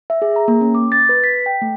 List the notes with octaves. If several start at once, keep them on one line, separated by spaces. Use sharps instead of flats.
E5
G#4
A#5
A#3
C#4
D6
A6
B4
B6
G5
A3